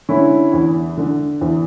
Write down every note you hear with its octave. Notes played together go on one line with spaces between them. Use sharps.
D3 C#4 E4
E2
D3
E2